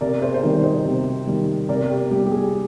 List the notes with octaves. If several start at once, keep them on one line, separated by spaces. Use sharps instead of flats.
C3 A#4 D5
G#4 C5
C5
D#3 G3 A#4 D5
C5 D#5
C3
D#3 G3
C3 A#4 D5
G4
G3 G4
G4
G#4